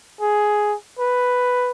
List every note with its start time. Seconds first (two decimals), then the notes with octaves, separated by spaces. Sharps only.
0.21 G#4
0.99 B4